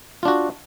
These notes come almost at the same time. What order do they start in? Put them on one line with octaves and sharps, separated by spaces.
F4 D4 F#4